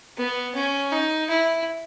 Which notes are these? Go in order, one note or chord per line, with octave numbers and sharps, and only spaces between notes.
B3
C#4
D#4
E4